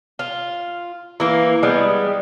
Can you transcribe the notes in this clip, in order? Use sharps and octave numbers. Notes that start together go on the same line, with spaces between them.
F4
E3 A#3
G3 G#3 B3